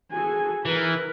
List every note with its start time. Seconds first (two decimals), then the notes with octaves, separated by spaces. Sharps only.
0.12 F#4 G#4 A4 G#5
0.66 E3 A#4 B4